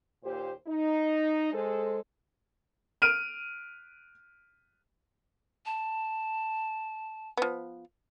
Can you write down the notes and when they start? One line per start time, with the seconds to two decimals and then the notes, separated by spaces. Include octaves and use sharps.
0.24 D#2 A#2 G4 C5
0.67 D#4
1.53 G#3 A4 C5
3.02 F6 D7 D#7
5.66 A5
7.37 F3 B3